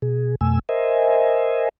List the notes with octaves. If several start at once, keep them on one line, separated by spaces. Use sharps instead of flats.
B2 G#4
F2 B2 A3 G#5 E6
A#4 C5 D#5 E5 G#5